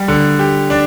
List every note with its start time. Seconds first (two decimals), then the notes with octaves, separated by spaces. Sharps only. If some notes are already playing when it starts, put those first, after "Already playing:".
Already playing: G3
0.08 D3
0.39 G4
0.70 D4